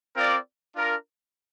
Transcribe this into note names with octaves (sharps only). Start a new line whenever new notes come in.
C4 F4 A#4 D5
D4 F4 A#4